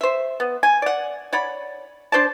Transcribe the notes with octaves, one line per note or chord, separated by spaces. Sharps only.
C5 E5
B3
G#5
D5 F#5
C#5 D5 F#5 B5
D4 C5 D5 A5